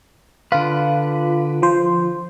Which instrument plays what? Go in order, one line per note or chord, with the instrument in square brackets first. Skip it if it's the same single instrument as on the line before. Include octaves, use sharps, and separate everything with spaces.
[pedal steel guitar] D3 B4 [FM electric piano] F4
[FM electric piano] F3 C5